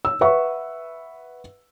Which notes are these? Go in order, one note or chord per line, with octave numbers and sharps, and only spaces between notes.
E6
B4 E5 F#5 C#6